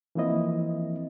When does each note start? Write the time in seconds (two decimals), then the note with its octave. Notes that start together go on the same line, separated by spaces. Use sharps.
0.15 E3 F3 A#3 C4 E4 D#5